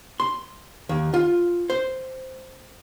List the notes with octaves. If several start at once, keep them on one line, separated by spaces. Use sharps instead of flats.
C6
D#2
F4
C5